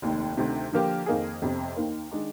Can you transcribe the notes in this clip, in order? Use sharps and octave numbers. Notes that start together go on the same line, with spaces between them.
F1 D#2 D#3
D2 C3 D#3
D3 F3 A#3 D4 G4
F2 D#3 A#3 D#4 G#4
G1 F2 C3
D#2 D#3 A#3
D#3 G#3 D4